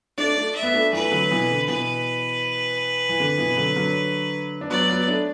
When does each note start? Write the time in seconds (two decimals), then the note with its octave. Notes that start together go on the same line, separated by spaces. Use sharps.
0.17 A3 D4 D5
0.36 A3 D4
0.56 E5
0.63 B3
0.74 A3 D4
0.93 E3 A3 B4
1.11 D3 F#3
1.31 B2 E3
1.50 D3
1.68 B2 E3 B4
3.09 E3
3.20 D3
3.38 B2 E3
3.57 D3 F#3
3.76 D3 F#3
4.61 D4
4.70 F#3 B3 D5
4.90 F#3 B3
5.07 A3 D4